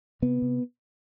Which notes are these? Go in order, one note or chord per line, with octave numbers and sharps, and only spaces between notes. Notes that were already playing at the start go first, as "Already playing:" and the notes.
C3 B3
C3